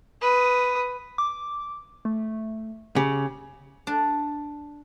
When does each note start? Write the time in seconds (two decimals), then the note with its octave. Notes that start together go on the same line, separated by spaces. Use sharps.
0.22 B4 D#6
1.18 D6
2.05 A3
2.96 C#3 G4
3.87 D4